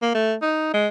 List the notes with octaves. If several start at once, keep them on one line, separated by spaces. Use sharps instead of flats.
A#3
A3
D#4
G#3